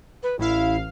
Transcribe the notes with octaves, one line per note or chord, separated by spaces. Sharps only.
B4
A1 E4 F5